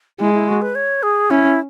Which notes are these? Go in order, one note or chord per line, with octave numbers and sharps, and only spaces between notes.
G#3 E4
E4
F#4
B4
C#5
G#4
C#4 E4